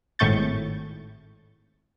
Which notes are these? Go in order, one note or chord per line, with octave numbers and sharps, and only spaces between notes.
G#1 A2 A3 C#6 G6 A6